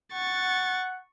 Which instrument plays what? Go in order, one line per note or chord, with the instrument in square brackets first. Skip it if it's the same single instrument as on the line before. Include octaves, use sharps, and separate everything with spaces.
[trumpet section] F#5 [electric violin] C#6 A6